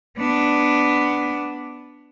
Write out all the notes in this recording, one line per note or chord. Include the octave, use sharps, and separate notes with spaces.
B3 D4